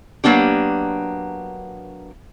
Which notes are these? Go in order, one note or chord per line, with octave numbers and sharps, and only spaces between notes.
F#3 A#3 B3 D4 G4